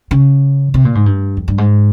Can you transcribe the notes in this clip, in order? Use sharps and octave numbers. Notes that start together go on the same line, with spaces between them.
C#3
C3
A#2
G#2
G2
F2
G2
G#2